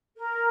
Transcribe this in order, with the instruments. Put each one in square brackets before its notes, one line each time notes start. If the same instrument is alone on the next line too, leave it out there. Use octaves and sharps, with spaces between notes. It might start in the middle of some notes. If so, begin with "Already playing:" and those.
[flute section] A#4